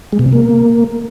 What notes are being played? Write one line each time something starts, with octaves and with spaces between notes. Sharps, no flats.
G#3
B2
C3
A#3